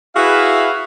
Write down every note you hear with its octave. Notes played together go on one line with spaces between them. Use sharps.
E4 F#4 G#4 B4 E5 F5